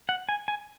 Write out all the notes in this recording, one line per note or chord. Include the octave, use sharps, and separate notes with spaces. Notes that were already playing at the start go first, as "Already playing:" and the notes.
F#5
G#5
G#5